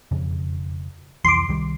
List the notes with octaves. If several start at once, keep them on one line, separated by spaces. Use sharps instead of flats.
E1 F2 C#3
C2 F2 E3 C6 D6
C2 D#3 G3